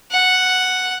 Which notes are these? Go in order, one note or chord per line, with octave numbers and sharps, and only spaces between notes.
F#5